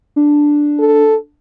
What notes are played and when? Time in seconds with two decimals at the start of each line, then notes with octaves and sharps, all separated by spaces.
0.16 D4
0.79 A4